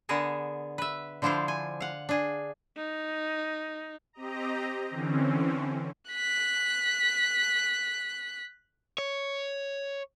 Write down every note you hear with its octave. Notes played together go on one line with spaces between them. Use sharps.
D3 B3 G#4 A#4 A5
B4 E5
D3 F3 D4 E4 C5 F5
G#5
F5 F#5
D4 G#4
D#4
C4 G4 D#5 A#5
D3 E3 C4 C#4
F#6 B6
C#5